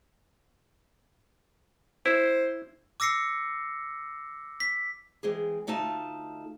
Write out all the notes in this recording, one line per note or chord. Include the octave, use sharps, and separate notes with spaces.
E4 C5
D6 E6 A#6 C7 C#7
B6
E3 G#3 C4 G#4
D2 A3 D#4 F4 A5